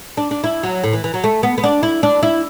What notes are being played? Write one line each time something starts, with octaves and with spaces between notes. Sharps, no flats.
D4
D4
E4
F#3
A2
E3
E3
F#3
A3
B3
B3
D4
E4
D4
E4